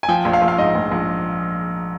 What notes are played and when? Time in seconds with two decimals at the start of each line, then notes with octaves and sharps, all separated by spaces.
0.03 G#5
0.08 F3 G5
0.25 A#1
0.33 F5
0.42 A#1
0.48 F5
0.58 G#2 D#5
0.75 A#1
0.92 A#1